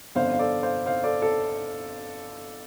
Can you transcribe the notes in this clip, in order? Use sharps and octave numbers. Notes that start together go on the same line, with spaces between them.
G1 F2 D3 C5 F5
F5
A4 D5
C5 F5
C5 F5
A4 D5
A4